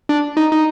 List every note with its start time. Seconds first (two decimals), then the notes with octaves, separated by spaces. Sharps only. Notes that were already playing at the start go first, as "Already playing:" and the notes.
0.09 D4
0.37 D#4
0.52 D#4